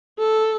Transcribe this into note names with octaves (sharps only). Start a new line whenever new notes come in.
A4